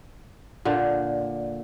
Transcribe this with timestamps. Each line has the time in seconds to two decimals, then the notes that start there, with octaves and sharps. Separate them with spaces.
0.65 A#2 D3